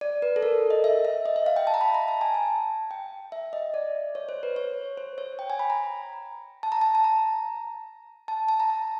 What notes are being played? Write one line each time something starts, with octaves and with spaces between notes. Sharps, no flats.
D5
B4
A4
A#4
D#5
E5
E5
D#5
E5
F5
G5
A5
A#5
B5
A#5
A5
G#5
A5
G5
E5
D#5
D5
C#5
C5
B4
C#5
C5
C#5
G5
G#5
B5
A#5
A5
A#5
A5
A5
A#5
A5
A5
A#5
A5